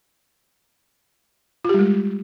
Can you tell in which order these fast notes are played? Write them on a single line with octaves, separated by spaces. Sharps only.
F4 G4 G3 G#3